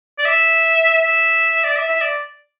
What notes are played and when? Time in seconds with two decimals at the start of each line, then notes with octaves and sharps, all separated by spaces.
0.18 D5
0.25 E5
1.01 E5
1.64 D5
1.76 E5
1.89 E5
2.01 D5